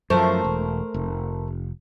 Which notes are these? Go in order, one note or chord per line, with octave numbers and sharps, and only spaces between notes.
F#2 F3 A3 A#4 C5
E1
F1